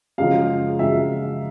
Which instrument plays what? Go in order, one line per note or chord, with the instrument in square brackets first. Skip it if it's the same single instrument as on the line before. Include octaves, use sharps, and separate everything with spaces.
[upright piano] F#2 C#3 F3 G#3 F5
F#2 C#3 F3 G#3 E5